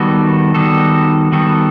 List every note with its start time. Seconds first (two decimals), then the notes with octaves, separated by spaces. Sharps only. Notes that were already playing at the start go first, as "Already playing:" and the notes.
Already playing: D#3 G3 B3 F#4 A4
0.55 D#3 G3 B3 F#4 A4
1.32 D#3 G3 B3 F#4 A4